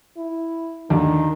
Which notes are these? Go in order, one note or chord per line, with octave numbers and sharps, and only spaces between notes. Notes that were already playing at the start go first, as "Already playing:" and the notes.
E4
D#2 D3 D#3